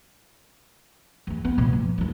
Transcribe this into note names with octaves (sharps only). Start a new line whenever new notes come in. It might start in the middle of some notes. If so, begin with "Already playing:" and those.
E3 A3
B3
A#2 E3
F3
D#3 F3